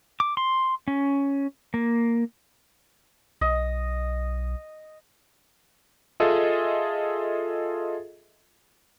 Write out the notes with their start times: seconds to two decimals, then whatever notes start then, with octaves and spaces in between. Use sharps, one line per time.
0.20 D6
0.37 C6
0.88 C#4
1.74 A#3
3.41 B1 D#5
6.20 F4 G#4 A4 D#5 E5